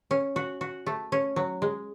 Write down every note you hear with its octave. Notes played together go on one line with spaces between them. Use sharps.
C#4
F#4
F#4
A3
C#4
F#3
G#3